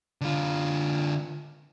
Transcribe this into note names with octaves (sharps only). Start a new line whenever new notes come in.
D3 F4